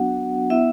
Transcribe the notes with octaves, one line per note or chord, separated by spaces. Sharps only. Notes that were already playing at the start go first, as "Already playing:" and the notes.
Already playing: F#3 B3 D4 F#4 F#5
B3 E4 E5